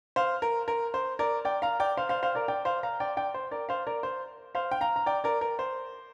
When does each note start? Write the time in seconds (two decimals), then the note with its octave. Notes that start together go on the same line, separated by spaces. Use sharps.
0.16 C5 F5
0.42 A#4
0.68 A#4
0.94 C5
1.19 A#4 D5
1.45 D5 G5
1.62 F5 A#5
1.80 D5 G5
1.97 C5 F5
2.09 C5 F5
2.23 C5 F5
2.35 A#4 D5
2.48 D5 G5
2.65 C5 F5
2.83 F5 A#5
3.00 D5 G5
3.17 D5 G5
3.34 C5
3.51 A#4 D5
3.69 C5 F5
3.87 A#4 D5
4.03 C5
4.55 C5 F5
4.72 G5
4.81 F5 A#5
4.96 A#5
5.06 D5 G5
5.24 A#4 D5
5.41 A#4
5.59 C5